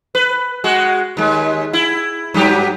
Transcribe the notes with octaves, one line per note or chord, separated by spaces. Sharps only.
B4
G#3 F#4
D#2 G#3
E4
G2 F#3 G4